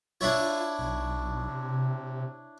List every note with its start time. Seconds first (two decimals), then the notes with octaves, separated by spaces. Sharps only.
0.21 D4 E4 F4 C#5
0.79 B1
1.48 C3